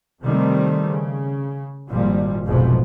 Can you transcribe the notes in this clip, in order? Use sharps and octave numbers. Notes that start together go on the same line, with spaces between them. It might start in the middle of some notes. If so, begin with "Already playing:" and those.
C3 D#3 G3 A3 C4
C#3
G#1 A#2 F3 G3
F1 B1 G#2 B2 F3 B3